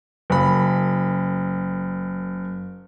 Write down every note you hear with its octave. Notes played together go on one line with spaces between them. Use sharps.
F#1 B5